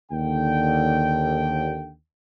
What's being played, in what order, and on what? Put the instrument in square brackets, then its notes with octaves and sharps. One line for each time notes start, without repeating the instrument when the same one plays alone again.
[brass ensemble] D#2 D3 G5